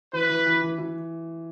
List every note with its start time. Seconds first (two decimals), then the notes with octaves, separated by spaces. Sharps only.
0.13 E3 B4
0.29 E3
0.46 E3
0.62 E3
0.78 E3